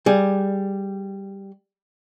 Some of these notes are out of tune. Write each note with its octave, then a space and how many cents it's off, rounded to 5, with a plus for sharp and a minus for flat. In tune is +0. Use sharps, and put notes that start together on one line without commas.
G3 +0 G#4 +0